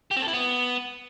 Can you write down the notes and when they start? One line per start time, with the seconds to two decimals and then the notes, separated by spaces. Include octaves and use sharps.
0.11 G4
0.17 C4
0.22 A4
0.28 E4
0.33 B3